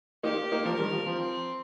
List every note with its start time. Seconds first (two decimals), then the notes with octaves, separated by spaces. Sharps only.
0.23 A#3 D#4 G4
0.52 A#3 D#4
0.65 F3 A#3 A#4
0.78 D#3 G3
0.92 F3
1.06 F3 C4